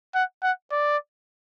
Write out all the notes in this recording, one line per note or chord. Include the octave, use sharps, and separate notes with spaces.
F#5
F#5
D5